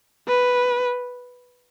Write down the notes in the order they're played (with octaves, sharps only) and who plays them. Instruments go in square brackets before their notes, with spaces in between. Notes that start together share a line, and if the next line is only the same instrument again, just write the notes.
[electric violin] B4